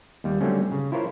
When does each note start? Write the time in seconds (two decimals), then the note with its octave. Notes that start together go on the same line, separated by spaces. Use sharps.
0.24 D#2 G3
0.41 D3 F#3 G3 A3 C4 C#4
0.71 C#3
0.92 E4 F4 A#4 C5 C#5